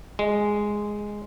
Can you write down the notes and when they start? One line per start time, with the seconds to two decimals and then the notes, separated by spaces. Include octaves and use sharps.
0.19 G#3